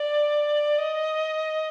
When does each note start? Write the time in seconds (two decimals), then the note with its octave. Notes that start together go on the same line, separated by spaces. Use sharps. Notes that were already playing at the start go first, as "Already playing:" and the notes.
Already playing: D5
0.78 D#5